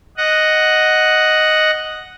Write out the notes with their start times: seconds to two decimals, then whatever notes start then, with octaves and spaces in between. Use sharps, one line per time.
0.17 D#5 F#5